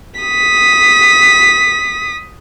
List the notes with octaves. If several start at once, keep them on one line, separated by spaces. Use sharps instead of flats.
D#6 B6